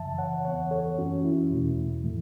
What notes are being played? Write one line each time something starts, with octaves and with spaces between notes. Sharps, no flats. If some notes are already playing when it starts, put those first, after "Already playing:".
Already playing: F#2 C#3 E3 E5 A5
C#5 F#5
E2 E3 B3 C#5 F#5
A4 C#5
F#2 E3 A3 C#4 F#4
E4
E2 B2 A3
A2 E3 A3